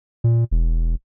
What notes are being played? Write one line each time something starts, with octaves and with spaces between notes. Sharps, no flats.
A#2
E1